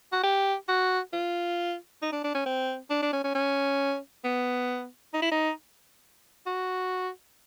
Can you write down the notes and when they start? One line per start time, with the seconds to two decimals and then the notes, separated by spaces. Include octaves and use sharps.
0.12 F#4
0.24 G4
0.69 F#4
1.13 F4
2.02 D#4
2.12 D4
2.24 D4
2.35 C#4
2.46 C4
2.90 D4
3.02 D4
3.13 C#4
3.24 C#4
3.35 C#4
4.24 B3
5.14 D#4
5.22 E4
5.32 D#4
6.47 F#4